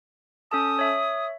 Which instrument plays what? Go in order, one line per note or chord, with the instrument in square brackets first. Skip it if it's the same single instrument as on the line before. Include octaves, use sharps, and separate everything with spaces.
[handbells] C#4 A4 A5 [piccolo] D#6
[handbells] C#5 E5